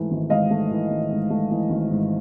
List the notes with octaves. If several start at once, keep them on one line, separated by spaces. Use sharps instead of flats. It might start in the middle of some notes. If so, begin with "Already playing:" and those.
Already playing: G#2 E3 A3
G#1
G#2 D#5 F5
A3
E3
G#1
G#2
A3
E3
G#1
G#2